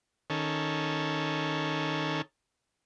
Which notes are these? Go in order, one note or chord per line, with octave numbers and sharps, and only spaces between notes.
D#3 C#4 A4